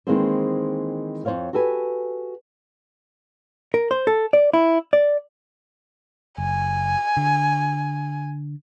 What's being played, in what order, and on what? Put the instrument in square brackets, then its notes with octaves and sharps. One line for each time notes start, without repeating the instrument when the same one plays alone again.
[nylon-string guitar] D#3 E3 G#3 A#3 C4 C5
F2 G#3 C5 C#5 F5
F#4 G4 A4 B4 G#5
[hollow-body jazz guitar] A#4
C5
A4
D5
E4
D5
[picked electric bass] F#1 [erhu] G#5
[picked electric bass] D3